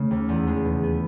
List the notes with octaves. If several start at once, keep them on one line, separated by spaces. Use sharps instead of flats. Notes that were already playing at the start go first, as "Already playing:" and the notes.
Already playing: C#3 A3
D#2
E2
G#3
B2
B3